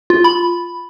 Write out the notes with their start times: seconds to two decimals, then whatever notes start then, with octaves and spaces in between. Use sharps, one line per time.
0.10 F4
0.24 B5